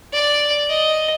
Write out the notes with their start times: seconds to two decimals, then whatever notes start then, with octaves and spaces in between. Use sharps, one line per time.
0.13 D5
0.69 D#5